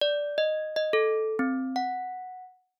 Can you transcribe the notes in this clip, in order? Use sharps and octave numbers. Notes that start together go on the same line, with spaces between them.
D5
D#5
D#5
A4
C4
F#5